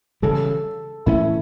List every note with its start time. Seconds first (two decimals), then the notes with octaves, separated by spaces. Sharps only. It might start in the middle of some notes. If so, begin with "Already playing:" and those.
0.22 C#3 E3 G3 A4
1.06 A2 E3 A3 C#4 E4